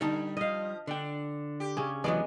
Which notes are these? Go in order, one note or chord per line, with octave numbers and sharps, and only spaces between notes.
D3 G3 D#4 A5
F3 D#5 F5
D3 D4 G5
G4
C#3 C#4
C2 E3 F#3 G#3 B3 D5